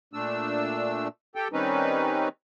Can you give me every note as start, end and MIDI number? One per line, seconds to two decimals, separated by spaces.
0.13 1.08 46
0.13 1.08 57
0.13 1.08 62
0.13 1.08 88
1.35 1.48 67
1.35 1.48 69
1.35 1.48 79
1.53 2.29 51
1.53 2.29 55
1.53 2.29 60
1.53 2.29 61
1.53 2.29 63
1.53 2.29 71